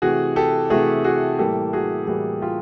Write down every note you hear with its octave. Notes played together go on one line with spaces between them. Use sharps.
C3 E3 A3 F#4 G#4
G4 A4
C3 E3 A3 F#4 G#4
F#4 G#4
A2 E3 G3 A#3 G4 A4
F#4 G#4
A2 E3 G3 A#3 F#4 G#4
F4 G4